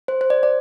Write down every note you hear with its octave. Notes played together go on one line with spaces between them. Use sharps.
C5
C5
D5
D5